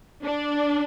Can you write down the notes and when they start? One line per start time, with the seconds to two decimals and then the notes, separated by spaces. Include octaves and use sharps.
0.23 D4